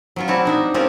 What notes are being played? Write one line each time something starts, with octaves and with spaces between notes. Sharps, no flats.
F#3 C#4 F4
C4 E4 F#4 D5 A5
D4 D#4 E5
C4 C#4 F4 G4 A4 A#4